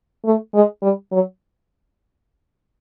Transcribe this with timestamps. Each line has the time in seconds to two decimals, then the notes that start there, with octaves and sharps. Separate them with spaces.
0.25 A3
0.54 G#3
0.82 G3
1.12 F#3